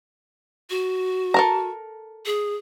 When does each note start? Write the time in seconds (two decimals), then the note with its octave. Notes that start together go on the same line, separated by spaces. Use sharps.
0.70 F#4
1.34 A4 A#4 A#5
2.26 G#4